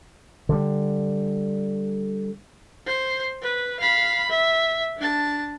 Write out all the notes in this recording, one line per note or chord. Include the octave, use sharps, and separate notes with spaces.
D3 G3
C5
B4
F5 B5
E5
D4 A5